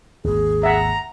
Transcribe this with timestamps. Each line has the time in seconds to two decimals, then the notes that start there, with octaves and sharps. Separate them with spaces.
0.24 G#1 D#2 G#4
0.63 E5 F#5 A#5